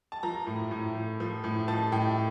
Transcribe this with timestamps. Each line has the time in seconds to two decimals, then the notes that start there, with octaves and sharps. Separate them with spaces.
0.12 A5
0.23 F3 A#5
0.47 A2
0.71 A2
0.95 F3
1.20 F3
1.44 A2
1.68 F3 A5
1.92 A2 G5